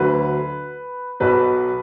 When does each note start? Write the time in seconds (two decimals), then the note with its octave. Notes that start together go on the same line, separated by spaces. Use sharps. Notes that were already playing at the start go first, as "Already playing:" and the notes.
Already playing: D2 D3 F#3 B4
1.20 B1 B2 F#3 B4